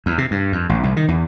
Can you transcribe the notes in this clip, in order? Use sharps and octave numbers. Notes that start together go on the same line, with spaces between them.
E2
C3
G2
F2
A1
C2
D#3
E2